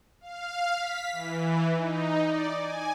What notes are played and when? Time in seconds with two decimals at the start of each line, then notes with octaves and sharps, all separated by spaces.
0.21 F5
0.73 B6
1.12 E3
1.75 D#4
2.26 D5
2.57 G#5